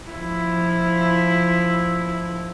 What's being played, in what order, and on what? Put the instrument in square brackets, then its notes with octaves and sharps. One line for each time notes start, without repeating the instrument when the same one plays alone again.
[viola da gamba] F3 E4